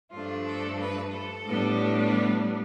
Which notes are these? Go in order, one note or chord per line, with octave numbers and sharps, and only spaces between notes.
G2 F3 A3 D4 F4
A4
B4
A4
A2 G3 B3 D4